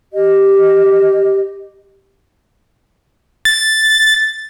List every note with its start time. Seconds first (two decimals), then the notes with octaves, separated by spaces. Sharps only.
0.12 G4 D#5
3.45 A6